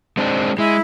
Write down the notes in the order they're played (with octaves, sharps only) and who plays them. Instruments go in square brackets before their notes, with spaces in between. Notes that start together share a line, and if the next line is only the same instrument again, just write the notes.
[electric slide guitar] G#3 C4 D4
[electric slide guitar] G#3 [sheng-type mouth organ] E4